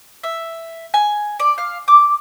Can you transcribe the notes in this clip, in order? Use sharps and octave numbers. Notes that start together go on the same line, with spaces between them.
E5
G#5
D5
F5
D6